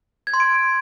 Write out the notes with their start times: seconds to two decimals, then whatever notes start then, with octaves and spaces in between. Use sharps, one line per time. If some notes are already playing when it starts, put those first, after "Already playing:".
0.27 G#6
0.34 C6
0.40 D7